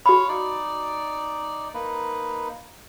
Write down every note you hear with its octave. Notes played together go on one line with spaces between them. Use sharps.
F#4 C#5 F5 B5
D#4 D5
A#3 D#4 B4